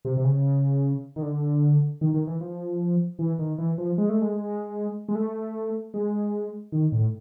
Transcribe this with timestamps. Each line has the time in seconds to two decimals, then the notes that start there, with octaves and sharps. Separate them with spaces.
0.05 C3
0.17 C3
0.24 C#3
1.16 D#3
1.22 D3
2.01 D#3
2.14 D#3
2.27 E3
2.41 F3
3.19 E3
3.39 D#3
3.58 E3
3.78 F3
3.98 G#3
4.09 A3
4.22 G#3
5.09 G#3
5.15 A3
5.94 G#3
6.72 D#3
6.92 A2